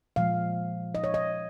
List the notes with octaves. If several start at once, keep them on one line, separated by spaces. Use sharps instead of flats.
A#2 F3 G#3 F5
D#5
C#5
D#5